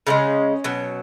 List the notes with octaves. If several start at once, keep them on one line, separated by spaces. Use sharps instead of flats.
C#3 E3 G#3 C#4
B2 F#3